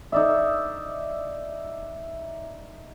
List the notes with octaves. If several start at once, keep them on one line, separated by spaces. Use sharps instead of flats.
D#4 D5 E5